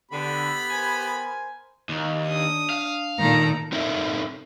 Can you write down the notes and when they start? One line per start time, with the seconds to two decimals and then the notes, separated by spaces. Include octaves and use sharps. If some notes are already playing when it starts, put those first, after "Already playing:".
0.11 D3 B3 G4 B5
0.70 A#4 C5 G#5
1.89 D#2
2.27 D4 D#6
2.70 F5
3.19 A#2 D#3 A4 A#5
3.72 C4 D#4 A4 A#4 D5 E5